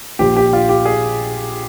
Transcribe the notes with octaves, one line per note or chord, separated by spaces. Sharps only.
A#1 A#2 F3 G4
G4
F4
G4
G#4